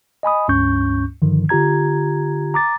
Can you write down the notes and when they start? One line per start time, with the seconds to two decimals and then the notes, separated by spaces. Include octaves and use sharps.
0.23 D#5 G#5 B5 D#6
0.48 C#2 G2 C#4 C#6 G6
1.22 G2 D3 D#3 F3
1.49 D3 F4 G4 A#5 G#6
2.54 A#5 D6 A6